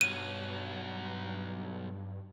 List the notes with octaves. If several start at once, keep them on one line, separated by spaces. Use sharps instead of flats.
B1 G2 F#3 D#7